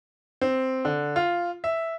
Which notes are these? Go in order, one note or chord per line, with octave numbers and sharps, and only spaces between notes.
C4
D3
F4
E5